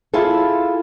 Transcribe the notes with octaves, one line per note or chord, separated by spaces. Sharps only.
E4 F4 G#4 A4